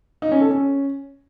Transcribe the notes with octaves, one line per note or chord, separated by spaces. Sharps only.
D#4
C#4
A4
C#4